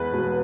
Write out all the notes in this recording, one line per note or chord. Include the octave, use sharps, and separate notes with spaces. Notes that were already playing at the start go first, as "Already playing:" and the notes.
Already playing: E2 G#3 B4
E1